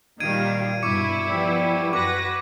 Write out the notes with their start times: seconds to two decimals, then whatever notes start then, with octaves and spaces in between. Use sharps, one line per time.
0.20 A#2 D#3 G3 F5 G#6 D7 D#7
0.83 G2 B2 E4 C#6 D6 C#7
1.29 F3 G3 B3
1.93 F#2 F#4 B4 D6 A#6